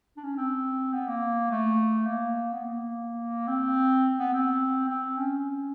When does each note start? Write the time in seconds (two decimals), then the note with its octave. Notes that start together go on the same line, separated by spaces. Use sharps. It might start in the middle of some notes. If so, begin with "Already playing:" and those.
0.17 D4
0.23 C#4
0.37 C4
0.93 B3
1.07 A#3
1.51 A3
2.07 A#3
2.52 B3
2.64 A#3
3.48 C4
4.19 B3
4.33 C4
4.89 C4
5.18 C#4